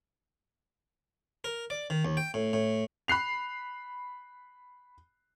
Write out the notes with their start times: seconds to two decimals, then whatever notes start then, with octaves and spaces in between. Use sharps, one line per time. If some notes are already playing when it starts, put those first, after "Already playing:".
1.44 A#4
1.70 D5
1.90 D#3
2.05 D#2
2.17 G5
2.34 A2
2.53 A2
3.08 B5 F#6 C7 F7